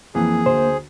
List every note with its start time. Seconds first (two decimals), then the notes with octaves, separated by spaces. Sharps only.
0.15 F2 E3 A#3 G#4
0.46 D2 C5